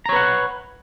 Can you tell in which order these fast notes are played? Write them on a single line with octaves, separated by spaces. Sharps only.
A#5 C#5 B4 F#5